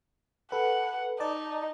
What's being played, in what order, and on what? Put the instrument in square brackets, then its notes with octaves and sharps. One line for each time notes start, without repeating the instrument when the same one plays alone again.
[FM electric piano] A4 B4 [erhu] F#5
[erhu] D#4 [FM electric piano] D5 A5